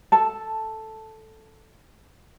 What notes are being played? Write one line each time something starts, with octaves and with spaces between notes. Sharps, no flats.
A4 A5